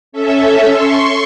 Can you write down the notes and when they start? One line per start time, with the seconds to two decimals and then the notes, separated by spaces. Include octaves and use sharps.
0.12 C#4 A4 E5
0.70 C6 C#6